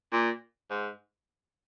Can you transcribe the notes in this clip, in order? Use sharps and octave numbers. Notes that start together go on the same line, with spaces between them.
A#2
G#2